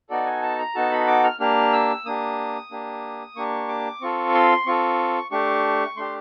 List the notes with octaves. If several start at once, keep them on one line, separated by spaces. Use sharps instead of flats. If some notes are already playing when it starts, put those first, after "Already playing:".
B3 D#4 F#4 A4 D5
G#5
A5
A#5
B3 D#4 F#4 A4 A5
B5
D6
F6
A#3 D4 G4 F6
E6
A#3 D4 G4 D#6
A#3 D4 G4
A#3 D4 G4 C#6
D6
C4 F4 A4 C#6
C6
C4 F4 A4 C#6
A3 D4 G4 C#6
A3 D4 G4 C6